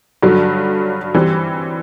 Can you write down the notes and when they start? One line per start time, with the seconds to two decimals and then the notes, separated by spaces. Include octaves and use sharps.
0.23 G2 D3 F#3
1.14 E3 G3 C4